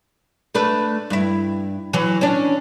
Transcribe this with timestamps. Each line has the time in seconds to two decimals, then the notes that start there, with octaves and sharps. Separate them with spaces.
0.55 A3 D4 B4
1.10 G2 E4
1.93 E3 F#3
2.21 C#4 D4